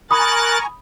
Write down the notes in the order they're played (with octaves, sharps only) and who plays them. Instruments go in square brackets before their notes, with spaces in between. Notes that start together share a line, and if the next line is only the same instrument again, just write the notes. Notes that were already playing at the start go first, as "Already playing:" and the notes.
[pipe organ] A#4 F#6 A6 [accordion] G#5 A#5 C#6 [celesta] B5 D#6